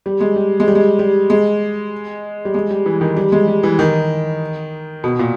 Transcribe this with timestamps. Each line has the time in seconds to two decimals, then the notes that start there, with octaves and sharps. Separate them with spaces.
0.06 G3
0.20 G#3
0.36 G3
0.60 G#3
0.68 G3
0.75 G#3
0.99 G3
1.30 G#3
2.45 G3
2.54 G#3
2.70 G3
2.86 E3
3.01 D#3
3.17 G3
3.32 G#3
3.48 G3
3.63 E3
3.79 D#3
5.04 B2
5.19 A#2